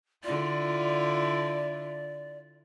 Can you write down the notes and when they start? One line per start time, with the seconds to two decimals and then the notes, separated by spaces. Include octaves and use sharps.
0.24 D3 E4 F4 D5